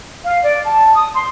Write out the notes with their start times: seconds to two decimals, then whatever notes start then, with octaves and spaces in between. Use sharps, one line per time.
0.24 F5
0.42 D5
0.65 A5
0.93 D#6
1.13 C6